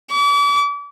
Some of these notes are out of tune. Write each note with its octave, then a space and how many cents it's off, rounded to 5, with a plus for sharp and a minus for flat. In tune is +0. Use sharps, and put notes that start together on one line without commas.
D6 -40